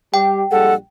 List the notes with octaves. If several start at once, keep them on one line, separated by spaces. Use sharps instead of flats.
G3 G4 G5
A#1 G3 G#3 A4 F#5